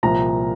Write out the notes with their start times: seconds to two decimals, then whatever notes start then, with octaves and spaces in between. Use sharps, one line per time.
0.03 C2 A#2 F3 A#5